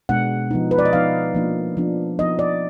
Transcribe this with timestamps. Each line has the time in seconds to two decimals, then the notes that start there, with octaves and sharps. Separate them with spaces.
0.09 B2 G#3 B3 D4 F#5
0.51 F3 B3 D#4
0.71 B4
0.79 D5
0.85 D#5
0.93 F3 B3 D#4 F5
1.35 F3 A#3 D4
1.77 F3 B3 D4
2.19 F3 B3 D#4 D#5
2.39 D5